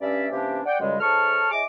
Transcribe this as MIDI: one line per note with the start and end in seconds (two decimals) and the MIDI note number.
0.01 0.26 43
0.01 0.26 61
0.01 0.26 74
0.01 0.26 76
0.30 0.60 48
0.30 0.60 52
0.30 0.60 58
0.30 0.60 61
0.30 0.60 62
0.30 0.60 67
0.65 0.75 74
0.65 0.75 78
0.65 0.75 79
0.80 1.00 37
0.80 1.00 42
0.80 1.00 49
0.80 1.00 55
0.80 1.00 56
1.00 1.46 44
1.00 1.46 69
1.00 1.46 73
1.00 1.46 81
1.00 1.46 85
1.00 1.46 89
1.51 1.62 64
1.51 1.62 68
1.51 1.62 73
1.51 1.62 75
1.51 1.62 86